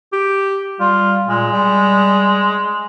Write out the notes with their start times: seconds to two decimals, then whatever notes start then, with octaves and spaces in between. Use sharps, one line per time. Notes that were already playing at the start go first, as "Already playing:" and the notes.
0.13 G4
0.80 G3 F4
1.28 A#2 G#3
1.52 G3